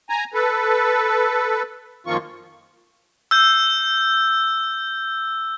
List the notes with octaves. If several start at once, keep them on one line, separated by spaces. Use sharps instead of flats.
G#5 A#5
A4 B4
F#2 D#3 F3 A#3 F4 C#6
E6 G6